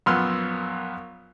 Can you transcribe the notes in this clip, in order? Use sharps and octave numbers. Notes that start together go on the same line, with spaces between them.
A#1 F#2 B3 C6 E6 F6